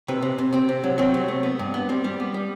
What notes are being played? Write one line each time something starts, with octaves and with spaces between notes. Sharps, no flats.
C3 B4
C3
C3
C3 C4
C3
F#3
F#3 C4
C3
A3
B3
G2
B3
G3 C4
G3
B3
G3